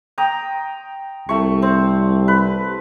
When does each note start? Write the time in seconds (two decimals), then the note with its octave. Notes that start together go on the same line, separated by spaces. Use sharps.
0.18 G5 A#5 D#6
1.29 C2 A3 C#6
1.62 C4
2.28 B4